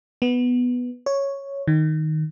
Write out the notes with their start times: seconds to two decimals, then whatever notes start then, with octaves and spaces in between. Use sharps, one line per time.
0.22 B3
1.06 C#5
1.68 D#3